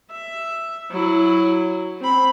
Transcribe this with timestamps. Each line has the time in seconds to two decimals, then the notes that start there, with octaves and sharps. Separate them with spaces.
0.11 E5
0.91 F#3 E4
2.01 C4 B5